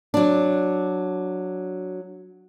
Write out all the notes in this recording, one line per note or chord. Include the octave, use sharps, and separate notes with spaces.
F#3 D4